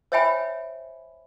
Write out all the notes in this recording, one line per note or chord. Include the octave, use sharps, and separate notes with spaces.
C5 C#5 E5 G5 G#5 B5